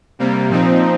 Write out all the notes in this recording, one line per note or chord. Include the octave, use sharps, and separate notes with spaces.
C3 G3 A#3
A#2 F3 C4 D#4